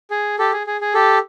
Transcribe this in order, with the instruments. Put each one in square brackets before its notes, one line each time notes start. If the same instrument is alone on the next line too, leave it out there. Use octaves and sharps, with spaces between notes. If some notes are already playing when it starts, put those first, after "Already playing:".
[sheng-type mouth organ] G#4
G4 A4
G#4
G#4
G#4
G4 A4